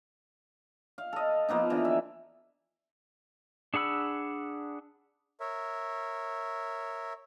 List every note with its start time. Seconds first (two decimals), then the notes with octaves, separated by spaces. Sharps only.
0.98 F5
1.13 A4 D#5
1.48 F3 A#3 B3 D#4
1.70 D3 E3
1.85 E5
3.74 D4 G#4 F#5 B5 E6
5.40 A#4 C#5 E5